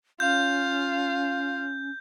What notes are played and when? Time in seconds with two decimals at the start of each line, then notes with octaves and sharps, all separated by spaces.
0.20 C#4 F4 F5 G6